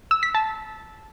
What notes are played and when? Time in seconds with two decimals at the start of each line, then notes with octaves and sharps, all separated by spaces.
0.11 E6
0.23 B6
0.35 A5